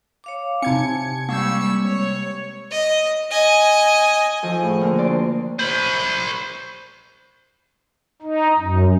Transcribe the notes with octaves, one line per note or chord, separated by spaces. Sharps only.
C#5 F5 D6
C3 C4 D#4 G#5 A5 G#6 C#7
G3 G#3 A#3 C#6 E6 G6
C#5
D#5
D#5 G#5
D#3 F3 A4 G#5
A2 G#4
D3 A#3 A#4
D2 D3 D5 C6 D6
C5 B5
D#4
F#2